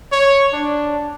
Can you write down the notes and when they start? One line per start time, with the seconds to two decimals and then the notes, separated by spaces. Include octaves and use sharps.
0.12 C#5
0.53 D4